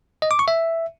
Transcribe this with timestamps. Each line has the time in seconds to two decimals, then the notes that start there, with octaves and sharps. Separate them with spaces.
0.22 D#5
0.31 D6
0.39 C#6
0.48 E5